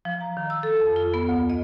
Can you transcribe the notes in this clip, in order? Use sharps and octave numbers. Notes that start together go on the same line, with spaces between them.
F3
A#5
D#3
E6
A4
F2
F4
B3
D2
D#5